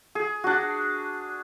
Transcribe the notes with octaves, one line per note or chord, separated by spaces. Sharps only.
G#4
D4 F#4